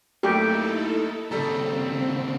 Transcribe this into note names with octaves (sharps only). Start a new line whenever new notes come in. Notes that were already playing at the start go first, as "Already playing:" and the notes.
F#2 A3 A#3 D#4 E4 G4 A4
D#2 C#3 G3 C4 A4 A#5